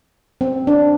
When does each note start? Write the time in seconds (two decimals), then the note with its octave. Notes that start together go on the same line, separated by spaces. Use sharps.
0.41 C4
0.67 D4